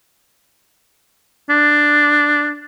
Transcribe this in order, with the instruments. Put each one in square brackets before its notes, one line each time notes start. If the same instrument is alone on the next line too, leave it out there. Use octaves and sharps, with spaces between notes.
[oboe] D4